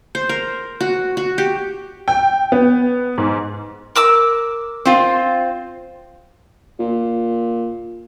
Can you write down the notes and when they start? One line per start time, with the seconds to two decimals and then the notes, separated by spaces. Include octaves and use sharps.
0.15 C5
0.29 A#4
0.80 F#4
1.17 F#4
1.38 G4
2.08 G5
2.52 B3
3.18 G#2
3.96 A#4 D6 E6
4.85 C4 F4
6.79 A#2